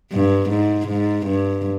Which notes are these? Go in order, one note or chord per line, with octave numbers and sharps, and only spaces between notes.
G2
G#2
G#2
G2